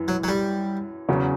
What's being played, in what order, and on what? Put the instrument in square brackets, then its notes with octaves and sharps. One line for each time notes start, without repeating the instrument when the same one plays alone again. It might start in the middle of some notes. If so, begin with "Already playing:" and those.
Already playing: [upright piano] F#2 E3
[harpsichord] F#3
F#3
G3
[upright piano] E2 C#3 F#3 C#4